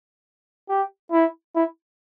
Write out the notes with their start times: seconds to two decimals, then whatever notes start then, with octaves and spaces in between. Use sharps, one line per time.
0.69 G4
1.12 E4
1.55 E4